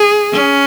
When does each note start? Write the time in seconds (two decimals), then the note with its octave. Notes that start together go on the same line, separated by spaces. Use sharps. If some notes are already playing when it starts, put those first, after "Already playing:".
Already playing: G#4
0.33 C#4